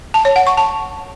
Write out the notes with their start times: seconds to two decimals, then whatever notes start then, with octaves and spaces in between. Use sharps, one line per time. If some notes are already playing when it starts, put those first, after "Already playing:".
0.14 A5
0.25 C#5
0.36 F#5
0.47 C#6
0.57 A5